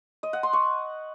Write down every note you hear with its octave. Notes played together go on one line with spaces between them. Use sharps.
D#5
F#5
C6
C#6